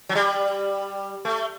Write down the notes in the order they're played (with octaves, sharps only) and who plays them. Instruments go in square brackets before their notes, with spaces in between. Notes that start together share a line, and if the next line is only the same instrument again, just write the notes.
[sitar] F#3
G3
A3